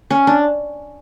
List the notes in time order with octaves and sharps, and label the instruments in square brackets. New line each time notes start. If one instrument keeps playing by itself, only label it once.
[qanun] C#4
D4